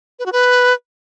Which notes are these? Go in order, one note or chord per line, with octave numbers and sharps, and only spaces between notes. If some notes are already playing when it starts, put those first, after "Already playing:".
B4
F#4
B4